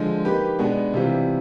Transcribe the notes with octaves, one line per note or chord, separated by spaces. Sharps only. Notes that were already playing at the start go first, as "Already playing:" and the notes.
Already playing: D3 F3 G#3
A#3 D#4 G4 B4
B2 G#3 B3 D4
C3 E3 G3 C4 F4